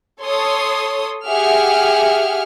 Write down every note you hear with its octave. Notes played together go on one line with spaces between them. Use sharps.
A4 C#5 C6 D#6
G4 G#4 E5 F#5 F6